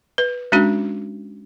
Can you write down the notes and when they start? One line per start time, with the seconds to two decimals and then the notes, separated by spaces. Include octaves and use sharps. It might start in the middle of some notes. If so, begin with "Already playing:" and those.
0.18 B4
0.52 G#3 C#4 D4 F#4